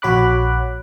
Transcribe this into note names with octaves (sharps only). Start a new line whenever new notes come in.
A#1 F#4 C#5 B5 D6 F#6